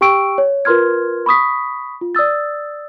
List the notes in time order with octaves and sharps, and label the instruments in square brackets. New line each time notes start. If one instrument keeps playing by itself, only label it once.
[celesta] G4 G5 C#6 E6 D7
C#5
F4 A#4 B4 C6 F6 G#6
B5 C#6 D#6 B6
F4
D5 D#6 E6 A6